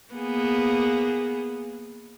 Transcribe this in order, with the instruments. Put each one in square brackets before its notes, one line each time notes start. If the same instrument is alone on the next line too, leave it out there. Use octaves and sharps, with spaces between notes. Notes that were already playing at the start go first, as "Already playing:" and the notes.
[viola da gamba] A#3 B3 G#4